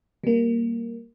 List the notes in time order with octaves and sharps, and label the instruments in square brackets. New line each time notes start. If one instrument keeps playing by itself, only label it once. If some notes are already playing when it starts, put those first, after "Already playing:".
[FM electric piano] G3 A#3